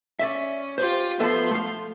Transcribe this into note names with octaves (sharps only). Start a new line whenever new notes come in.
C#4 D5 E5
F4 G4 C5
F3 B3 A4 E5 C6
A3 F5